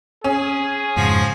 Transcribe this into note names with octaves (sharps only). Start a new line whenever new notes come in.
C#4 G#4
F2 G#2 C#3 F3 F#4 C6